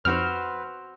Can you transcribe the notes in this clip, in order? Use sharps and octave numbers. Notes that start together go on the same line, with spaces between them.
F2 F3 C4 D#4 F#4 B4 C5 F6